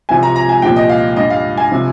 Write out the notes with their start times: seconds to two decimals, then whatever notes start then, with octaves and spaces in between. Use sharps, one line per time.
0.09 C2 C3 F3 G#5
0.23 A#5
0.36 A#5
0.49 G#5
0.62 C2 A#2 F3 G5
0.76 D#5
0.89 F5
1.16 G2 G3 D#5
1.30 F5
1.57 G#5
1.72 C3 F3